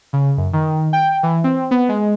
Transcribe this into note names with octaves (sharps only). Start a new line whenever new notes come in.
C#3
F#2
D#3
G5
E3
C4
B3
G#3